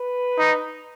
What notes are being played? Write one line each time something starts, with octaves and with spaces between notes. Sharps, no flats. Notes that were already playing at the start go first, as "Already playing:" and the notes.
Already playing: B4
D#4